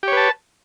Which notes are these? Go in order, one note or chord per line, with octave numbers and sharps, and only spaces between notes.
G4 B4 C#5 A5